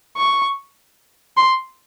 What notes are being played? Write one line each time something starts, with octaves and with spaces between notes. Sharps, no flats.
C#6
C6